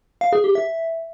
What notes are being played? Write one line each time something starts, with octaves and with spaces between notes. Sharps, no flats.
F5
G#4
G4
E5